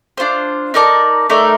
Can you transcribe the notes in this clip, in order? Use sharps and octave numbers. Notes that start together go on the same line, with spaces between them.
D4 F4 C5
D#4 A#4 D5 A5
A3 D#4 A#4 D5